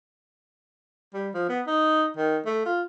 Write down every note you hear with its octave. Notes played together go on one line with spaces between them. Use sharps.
G3
F3
B3
D#4
D#3
A3
F4